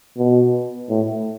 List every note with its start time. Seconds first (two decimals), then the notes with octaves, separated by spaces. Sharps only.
0.18 B2
0.89 A2